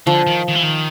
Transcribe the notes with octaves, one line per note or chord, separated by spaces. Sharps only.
D3 F3
D#3
D#3
E3
D#3